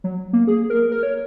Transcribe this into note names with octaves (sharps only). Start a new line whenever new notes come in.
F#3
A#3
G#4
A#4
A#4
C#5